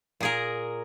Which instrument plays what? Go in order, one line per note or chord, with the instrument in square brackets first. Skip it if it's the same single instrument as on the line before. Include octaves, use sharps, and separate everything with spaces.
[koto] A#2 G#4 A#4